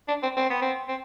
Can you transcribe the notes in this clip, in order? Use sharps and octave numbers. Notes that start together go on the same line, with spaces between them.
D4
C4
C4
B3
C4
C4